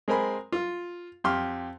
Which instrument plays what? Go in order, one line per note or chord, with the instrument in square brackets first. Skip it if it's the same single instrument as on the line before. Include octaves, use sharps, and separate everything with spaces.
[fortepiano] G#3 C4 A#4 G#5 B5
F4
F2 G4 C6 F6